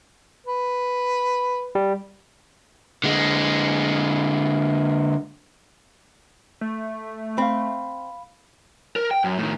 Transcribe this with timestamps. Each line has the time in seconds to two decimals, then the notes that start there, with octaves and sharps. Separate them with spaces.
0.46 B4
1.75 G3
3.04 D3 G#3
6.61 A3
7.38 C4 F5 B5
8.96 A#4
9.11 G5
9.24 F#2
9.38 A2 D#3